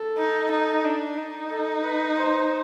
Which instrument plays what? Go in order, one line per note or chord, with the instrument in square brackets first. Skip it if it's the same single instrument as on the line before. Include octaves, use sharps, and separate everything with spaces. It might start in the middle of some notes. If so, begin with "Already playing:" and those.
Already playing: [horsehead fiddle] A4
[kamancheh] D#4
D#4
D4
D#4
[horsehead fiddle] A4
B4
C5